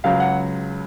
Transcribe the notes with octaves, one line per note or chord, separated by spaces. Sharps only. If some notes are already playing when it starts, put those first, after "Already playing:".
C#2 C#3 F#3 F5
F#5